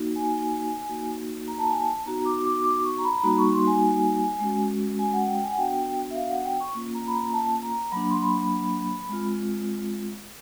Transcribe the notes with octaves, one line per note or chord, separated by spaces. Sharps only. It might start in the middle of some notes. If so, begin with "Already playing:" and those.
Already playing: A#3 D#4 F#4
G#5
A#3 D#4 F#4
A#5
A5
G#5
A5
B3 D#4 F#4 A#5
D6
D6
D6
C#6
A#5
B5
A#5
G3 A#3 D#4 F#4 B5
C#6
C6
G#5
G#3 C#4 F#4
G#5
F#5
G5
G#5
F#5
B3 D4 F#4 G5
E5
F5
F#5
G5
C#6
A#3 C#4 F4
A#5
B5
A#5
A5
A#5
F#3 A#3 D4 B5
C6
B5
G#3 C4 F4